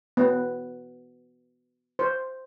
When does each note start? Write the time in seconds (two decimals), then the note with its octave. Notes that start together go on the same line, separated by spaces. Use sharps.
0.17 B3
1.99 C5